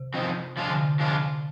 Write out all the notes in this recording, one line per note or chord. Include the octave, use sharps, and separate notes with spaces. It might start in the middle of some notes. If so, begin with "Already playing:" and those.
Already playing: C3
F3 C4 D#4
C3 F3 G#3 D4 F4
D3
C3
F3 G#3 D4 F4